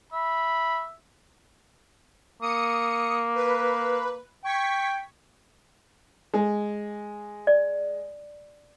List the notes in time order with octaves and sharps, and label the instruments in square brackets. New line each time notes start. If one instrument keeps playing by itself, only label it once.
[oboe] E5 [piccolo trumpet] B5
[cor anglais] A#3 [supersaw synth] D#6 C#7
[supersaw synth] B4
[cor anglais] G5 [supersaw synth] C#6 G#6 B6
[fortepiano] G#3
[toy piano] D5